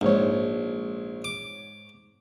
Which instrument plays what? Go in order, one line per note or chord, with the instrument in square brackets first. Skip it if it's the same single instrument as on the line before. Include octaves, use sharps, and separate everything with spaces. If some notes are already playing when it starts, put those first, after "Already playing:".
[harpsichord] A#1 [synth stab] G#2 C#5
[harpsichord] D6